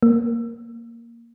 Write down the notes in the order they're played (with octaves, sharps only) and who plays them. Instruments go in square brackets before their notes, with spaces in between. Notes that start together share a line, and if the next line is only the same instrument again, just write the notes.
[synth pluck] A#3